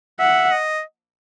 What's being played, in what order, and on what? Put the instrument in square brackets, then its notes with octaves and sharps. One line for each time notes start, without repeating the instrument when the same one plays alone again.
[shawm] E5 [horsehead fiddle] F#5
[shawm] D#5